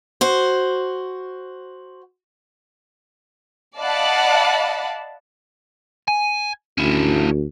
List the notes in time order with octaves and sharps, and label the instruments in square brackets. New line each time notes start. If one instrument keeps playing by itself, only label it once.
[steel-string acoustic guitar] F#4 C5
[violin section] D5 D#5 F5 F#5 A5 B5
[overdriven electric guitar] G#5
[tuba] D2 [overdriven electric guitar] C#4 E4